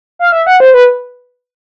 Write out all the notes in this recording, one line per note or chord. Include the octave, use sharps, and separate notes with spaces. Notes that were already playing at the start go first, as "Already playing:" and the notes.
F5
E5
F#5
C5
B4